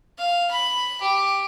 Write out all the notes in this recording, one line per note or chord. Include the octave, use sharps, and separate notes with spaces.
F5
B5
G4